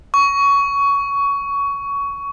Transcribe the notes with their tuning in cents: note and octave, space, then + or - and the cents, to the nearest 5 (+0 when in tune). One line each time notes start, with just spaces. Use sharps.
C#6 +20